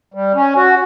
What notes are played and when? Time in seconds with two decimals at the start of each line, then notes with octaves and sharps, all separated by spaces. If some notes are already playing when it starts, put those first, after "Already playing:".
0.14 G3
0.35 C#4
0.56 F#4